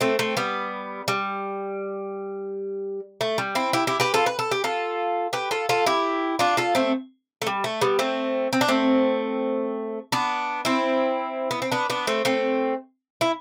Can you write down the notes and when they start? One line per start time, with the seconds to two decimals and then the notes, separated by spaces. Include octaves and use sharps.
0.01 A3 C4
0.19 A3 C4
0.37 G3 B3
1.08 G3
3.21 A3
3.38 G3
3.55 C4 E4
3.73 E4 G4
3.87 E4 G4
4.00 G4 B4
4.14 F4 A4
4.26 B4
4.39 A4
4.51 G4
4.64 F4 A4
5.33 G4 B4
5.51 F4 A4
5.69 F4 A4
5.86 E4 G4
6.39 D4 F4
6.57 F4 A4
6.75 A3 C4
7.42 A3
7.47 G3
7.64 A3
7.81 G3 B3
7.99 A3 C4
8.53 C4
8.61 D4
8.68 A3 C4
10.12 B3 D4
10.65 C4 E4
11.51 B3
11.62 C4
11.72 B3 D4
11.90 B3 D4
12.07 A3 C4
12.25 A3 C4
13.21 E4